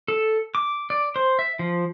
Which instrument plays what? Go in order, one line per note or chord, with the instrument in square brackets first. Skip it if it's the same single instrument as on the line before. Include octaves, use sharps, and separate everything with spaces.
[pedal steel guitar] A4
D6
D5
C5
E5
F3